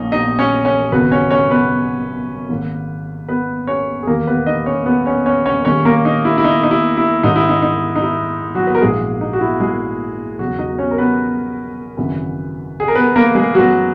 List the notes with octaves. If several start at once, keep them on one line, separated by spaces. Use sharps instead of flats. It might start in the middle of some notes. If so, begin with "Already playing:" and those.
Already playing: A#1 A#2 A#3 C#4 D#4
D#4 D#5
C#4 C#5
C#4 C#5
G#1 F#2 C#3 F#3 B3 B4
C#4 C#5
C#4 C#5
B3 B4
G#1 G#2 D#3 A#3
B3 B4
C#4 C#5
G#4
E1 D#2 D#3 A#3 A#4
B3 B4
D#4 D#5
C#4 C#5
B3 B4
C#4 C#5
C#4 C#5
C#4 C#5
D#2 D#3 G#3 C#4 C#5
A#3 A#4
D#4
E4
E4
D#4
D#4
E4
E4
G#2 D#3 G#3 C#4 D#4
E4
D#4
D#4
D#4
E4
F#3 F#4
B4
A#4
A#1 G#2 E3 G#3 A#3 G#4
D#4
F#4
E4
G#3 G#4
E1 E2 C#3 F#3 F#4
D#4 D#5
C#4 C#5
A#4
B3 B4
G#1 F#2 C#3 E3
G#4
A#4
B3 B4
A#3 A#4
G#3 G#4
F#2 E3 F#3 G#3 B3 F#4